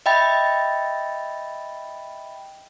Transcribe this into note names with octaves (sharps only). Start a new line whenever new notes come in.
D#5 E5 G5 B5 A6